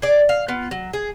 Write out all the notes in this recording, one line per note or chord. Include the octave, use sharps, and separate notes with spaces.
G#4 D5
F5
B3 F4
F#3
G#4